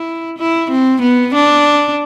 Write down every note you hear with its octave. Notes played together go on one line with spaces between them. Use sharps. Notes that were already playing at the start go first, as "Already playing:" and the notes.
Already playing: E4
E4
C4
B3
D4